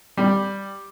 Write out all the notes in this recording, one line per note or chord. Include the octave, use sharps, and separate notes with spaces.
G3